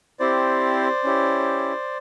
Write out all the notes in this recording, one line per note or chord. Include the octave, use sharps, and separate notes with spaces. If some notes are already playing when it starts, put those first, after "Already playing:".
C4 E4 G4 C5 D5
C#4 E4 G4